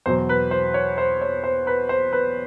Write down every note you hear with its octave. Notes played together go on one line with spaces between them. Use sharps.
E2 B2 F#3 C5
B4
C5
C#5
C5
C#5
C5
B4
C5
B4